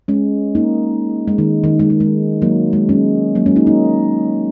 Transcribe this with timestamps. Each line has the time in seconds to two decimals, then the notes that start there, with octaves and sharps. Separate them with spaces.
0.08 G#3 C#4
0.55 A#3 D#4
1.28 G#3
1.38 D#3
1.64 D#3
1.79 G#3
1.90 G#3
2.00 G#3
2.42 F#3 A#3
2.73 G#3
2.89 G#3 C#4
3.35 F#3 A#3
3.46 G#3 C#4
3.56 A#3 D#4
3.67 A#3 D#4